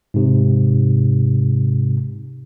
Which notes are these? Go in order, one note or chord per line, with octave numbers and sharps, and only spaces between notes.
G#2 C3